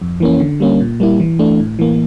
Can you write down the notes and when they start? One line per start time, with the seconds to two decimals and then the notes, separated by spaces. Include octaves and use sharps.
0.02 F2
0.20 E3 A#3 C#4
0.40 D3
0.60 G3 A#3 C#4
0.80 A#2
1.00 G3 A#3 E4
1.20 E3
1.39 A3 D4
1.60 A2
1.79 E3 A#3